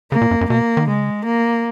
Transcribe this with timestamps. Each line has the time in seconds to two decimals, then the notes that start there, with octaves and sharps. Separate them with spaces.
0.12 C#3 A#3
0.21 A#2
0.31 F#2
0.41 F#2
0.50 B2 A#3
0.77 D#3
0.88 C#3 G#3
1.25 A#3